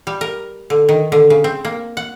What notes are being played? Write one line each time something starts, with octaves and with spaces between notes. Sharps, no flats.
G3
A#4
D3
D#3
D3
C#3
C4
A#3
F#5